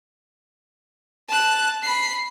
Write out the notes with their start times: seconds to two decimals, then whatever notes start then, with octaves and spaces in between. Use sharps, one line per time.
1.29 A5 F#6
1.83 B5 C7